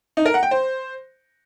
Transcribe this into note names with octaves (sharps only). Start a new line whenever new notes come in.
D#4
A#4
F#5
G5
C5